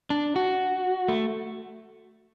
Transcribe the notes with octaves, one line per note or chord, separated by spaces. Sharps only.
D4
F#4
A3